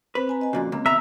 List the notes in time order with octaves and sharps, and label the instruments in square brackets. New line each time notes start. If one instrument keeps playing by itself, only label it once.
[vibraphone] C4 C5 [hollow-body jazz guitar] B4
[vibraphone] C4 G#5 A#5
D#5 G#5
[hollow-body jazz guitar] F2 A#2 C#3 [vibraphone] F#4
[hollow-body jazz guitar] C#2 A#3 [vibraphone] C4
[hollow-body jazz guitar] D#2 B2 A#5 [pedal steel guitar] E5 [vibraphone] E6